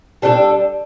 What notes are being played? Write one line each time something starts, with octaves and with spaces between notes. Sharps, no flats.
G3 D4 F#4 A4